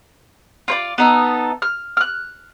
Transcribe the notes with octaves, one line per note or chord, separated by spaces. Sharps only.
F4 C5 D5
B3 D#4 A4
F6
F6 F#6